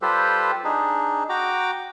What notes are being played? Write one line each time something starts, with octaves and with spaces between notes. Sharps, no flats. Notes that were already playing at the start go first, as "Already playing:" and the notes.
G3 F4 G4 A4 B4 C5
D4 D#4 G#4
F#4 G5 A#5 D6